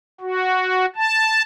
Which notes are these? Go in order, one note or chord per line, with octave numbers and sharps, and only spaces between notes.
F#4
A5